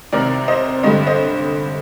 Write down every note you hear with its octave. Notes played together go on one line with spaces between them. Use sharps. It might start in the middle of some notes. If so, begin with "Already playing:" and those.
C2 C3 D#3 A#4 D5
C5 D#5
G2 D3 G3 C5 D#5
C5 D#5